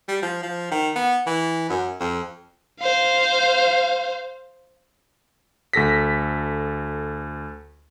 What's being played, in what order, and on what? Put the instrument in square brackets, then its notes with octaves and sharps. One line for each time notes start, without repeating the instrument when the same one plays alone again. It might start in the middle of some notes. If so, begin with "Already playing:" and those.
[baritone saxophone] G3
F3
F3
D#3
B3
E3
F#2
F2
[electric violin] C5 F5
[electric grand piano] D2 A4 A#6 B6